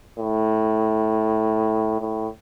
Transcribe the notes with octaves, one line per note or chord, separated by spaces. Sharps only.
A2
A2